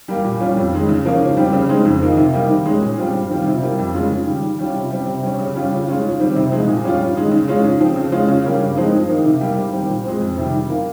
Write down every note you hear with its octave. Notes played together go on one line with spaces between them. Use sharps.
G3 A#3
A#2
G3 C#4 F4
F2
D#3 G#3
C#3
F3 A#3 C#4
G#2
G3 C4
C#3
G#3 C4 D#4
F2
D#3 A#3 D#4
C3
G3 A#3 D#4
D#3
G#3 C#4
A#2
G3 C4 F4
G2
D#3 G3 C4 F4
C3
G3 A#3 F4
F2
C#3 G#3 C#4 F4
G#2
D#3 G3
D#3
G3 C#4 F4
C3
G3 C4
C3
G3 C#4
C#3
G3 C#4 F4
C#3
G#3 C#4 F4
G#2
D#3 G3 C4
C3
F3 G#3 D#4
A#2
G3 C#4 F4
G2
D#3 G#3 D#4
C#3
G#3 C#4 F4
G#2
F3 C4
C#3
G#3 C#4 F4
C#3
G3 A#3 C#4
G2
F3 G#3 C4 D#4
G2
D#3 A#3 D#4
C3
G3 A#3
G#2
D#3 G3 C4
A#2
G#3 C4
F2
C3 D#3 G3
D#3
A#3 F4